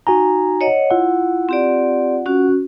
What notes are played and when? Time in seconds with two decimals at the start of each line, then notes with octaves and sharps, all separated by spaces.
0.07 D#4 F#4 G#5 A#5
0.61 C#5 D#5 F#5
0.91 E4 F4 F#5
1.49 C4 G4 D5
2.26 C#4 F#4